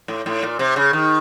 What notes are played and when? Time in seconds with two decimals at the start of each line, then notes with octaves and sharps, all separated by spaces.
0.08 A2
0.26 A2
0.43 A#2
0.59 C3
0.76 C#3
0.93 D#3